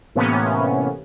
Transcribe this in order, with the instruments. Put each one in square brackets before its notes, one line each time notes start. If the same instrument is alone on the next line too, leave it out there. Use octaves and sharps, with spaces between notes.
[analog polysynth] A2 C3 E3 A#3 B3 C#4